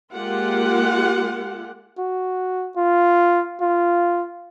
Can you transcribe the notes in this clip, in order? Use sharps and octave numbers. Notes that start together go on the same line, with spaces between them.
G#3 A#3 F4 G4 F#5
F#4
F4
F4